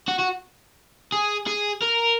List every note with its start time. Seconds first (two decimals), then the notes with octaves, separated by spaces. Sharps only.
0.08 F#4
0.19 F#4
1.12 G#4
1.47 G#4
1.82 A#4